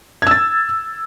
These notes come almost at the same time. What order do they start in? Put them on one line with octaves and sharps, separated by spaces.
G#6 E6 A6